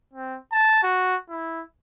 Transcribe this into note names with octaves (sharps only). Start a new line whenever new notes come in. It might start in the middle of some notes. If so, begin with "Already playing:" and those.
C4
A5
F#4
E4